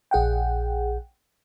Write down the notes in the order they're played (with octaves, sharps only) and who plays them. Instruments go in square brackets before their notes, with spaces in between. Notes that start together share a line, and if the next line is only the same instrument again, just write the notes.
[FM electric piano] A#1 G#4 F#5 G5